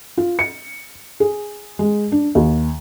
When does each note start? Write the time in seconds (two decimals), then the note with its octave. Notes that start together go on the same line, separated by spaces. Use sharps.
0.18 F4
0.39 C#7
1.20 G#4
1.79 G#3
2.12 D4
2.35 D#2